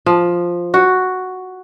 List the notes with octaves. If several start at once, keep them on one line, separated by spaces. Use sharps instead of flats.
F3
F#4